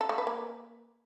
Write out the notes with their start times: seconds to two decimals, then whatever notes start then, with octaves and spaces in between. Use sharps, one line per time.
0.01 A4
0.09 A3
0.18 B4
0.27 A#3